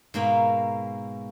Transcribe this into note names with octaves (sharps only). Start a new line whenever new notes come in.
G#2 B2 A#3 B5